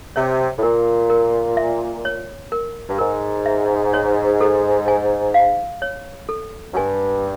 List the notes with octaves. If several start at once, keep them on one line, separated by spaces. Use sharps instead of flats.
C3 C#5
A2
A#2 A#4
A#4
E5
C#5
A#4
G2
G#2 A#4
E5
C#5
A4
G#5
F5
C#5
A4
F#2
G2 G#5